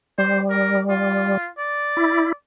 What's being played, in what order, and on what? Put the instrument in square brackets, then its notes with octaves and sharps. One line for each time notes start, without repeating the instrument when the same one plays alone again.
[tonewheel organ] G3 [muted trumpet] C5
[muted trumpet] A#4
F4
D5
[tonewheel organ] E4